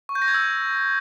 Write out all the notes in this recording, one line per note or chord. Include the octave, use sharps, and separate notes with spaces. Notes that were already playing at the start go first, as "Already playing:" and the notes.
C#6
G6
A#6
G#6
E6